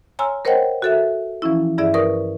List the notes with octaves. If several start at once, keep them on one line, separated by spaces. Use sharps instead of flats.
C#5 G#5 A#5 C6 E6 F6
A#4 C5 C#5 D#5 F#5 G5
F#4 A4 E5
E3 F3 C#4 E4
G2 E4 G#4 D5 E5
A#4 B4 D5 C#6 D#6